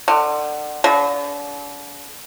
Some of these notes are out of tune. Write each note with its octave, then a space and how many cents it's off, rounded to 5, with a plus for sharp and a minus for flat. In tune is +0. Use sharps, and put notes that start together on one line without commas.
D3 +30
D3 -40